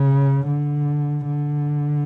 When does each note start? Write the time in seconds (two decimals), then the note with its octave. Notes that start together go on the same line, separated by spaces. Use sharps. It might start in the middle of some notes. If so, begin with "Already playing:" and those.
Already playing: C#3
0.48 D3
1.28 D3